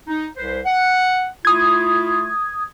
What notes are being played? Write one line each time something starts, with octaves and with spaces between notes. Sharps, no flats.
D#4
C2 B4 C5
F#5
A3 E4 F4 D#6 G#6